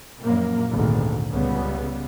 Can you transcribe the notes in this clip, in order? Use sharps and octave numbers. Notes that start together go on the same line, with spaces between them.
A#1 F#2 A#2 A#3
G#1 D2 A#2
C#2 C#3 G3 B3